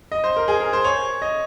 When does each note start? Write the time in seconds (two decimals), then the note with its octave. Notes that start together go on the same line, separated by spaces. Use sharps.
0.12 D#5
0.24 C5
0.36 A#4
0.48 G#4
0.60 A#4
0.73 C5
0.84 C#5
1.22 D#5